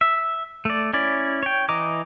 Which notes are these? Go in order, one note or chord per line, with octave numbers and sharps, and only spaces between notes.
E5
A3 D5
C#4 E4 D5
C#5 G5
E3 D#5 A#5 D6